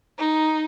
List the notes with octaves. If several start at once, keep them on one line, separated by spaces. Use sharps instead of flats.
D#4